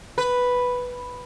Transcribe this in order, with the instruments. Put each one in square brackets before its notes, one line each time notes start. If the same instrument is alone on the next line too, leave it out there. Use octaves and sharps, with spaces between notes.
[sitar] B4